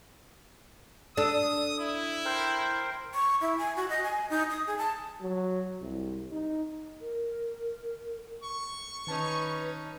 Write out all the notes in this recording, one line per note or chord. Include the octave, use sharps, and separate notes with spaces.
D4 A4 D#6
E4
A#4 C5 G5
C#6
E4
G#5
F#4
D#5
G#5
D#4
D#6
G#4
A5
F#3
C2
D#4
A#4
C#6
D#3 C#4 D#4 B4 A5